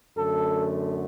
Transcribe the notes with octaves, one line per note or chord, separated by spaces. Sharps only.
F#2 D3 A3 A4